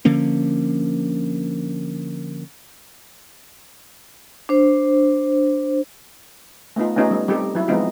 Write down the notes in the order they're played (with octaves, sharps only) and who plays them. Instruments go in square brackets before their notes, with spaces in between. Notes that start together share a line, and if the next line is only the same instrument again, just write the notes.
[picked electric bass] D3 F3 A#3 C#4
[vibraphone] D4 C5
[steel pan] A3 B3 D#4 F4
A3 B3 C#4 D#4 F4 G4
G3
G3 C4 D#4 G4 A4
F#3 E4
F3 G#3 B3 C4 D#4 F4